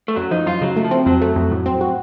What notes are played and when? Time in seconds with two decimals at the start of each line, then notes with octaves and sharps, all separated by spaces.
0.08 A3
0.16 F#2 F#3
0.31 F3 D#4
0.46 F#2 F4
0.61 C#3 F#3
0.77 A3
0.84 F3
0.91 C4
1.06 F2 F#3
1.22 A3
1.36 F2
1.51 A2
1.66 C4
1.81 F#4